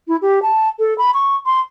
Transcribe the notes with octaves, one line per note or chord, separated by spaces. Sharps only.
E4
G4
A5
A4
B5
C#6
C6